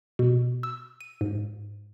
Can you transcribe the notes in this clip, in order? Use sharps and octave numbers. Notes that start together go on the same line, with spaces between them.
B2
E6
D#7
G#2